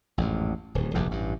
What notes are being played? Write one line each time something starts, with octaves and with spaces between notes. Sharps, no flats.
A1 F2 G#2
D1 D#2
F1 A#1 E2 G2
A1 G2